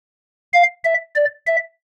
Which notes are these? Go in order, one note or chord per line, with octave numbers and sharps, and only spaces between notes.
F5
E5
D5
E5